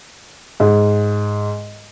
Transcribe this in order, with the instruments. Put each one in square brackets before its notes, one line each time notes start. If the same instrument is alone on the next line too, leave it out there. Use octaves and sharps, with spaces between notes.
[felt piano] G#2